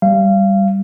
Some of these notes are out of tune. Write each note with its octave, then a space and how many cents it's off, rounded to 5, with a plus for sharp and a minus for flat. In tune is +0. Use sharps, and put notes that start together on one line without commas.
G3 +0 F5 -25